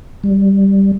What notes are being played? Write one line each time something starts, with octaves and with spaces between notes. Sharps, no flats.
G3